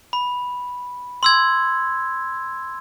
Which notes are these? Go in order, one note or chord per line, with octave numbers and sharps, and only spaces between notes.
B5
C6 E6 G#6